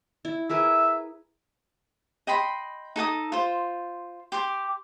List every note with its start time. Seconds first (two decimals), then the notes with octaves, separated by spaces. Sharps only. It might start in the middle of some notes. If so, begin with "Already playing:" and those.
0.25 E4
0.50 G#4 A#4 B4 E5
2.27 D#5 G5 B5 C6
2.96 D#4 A4 G5 D#6
3.32 F4 C5
4.32 G4 C6 D6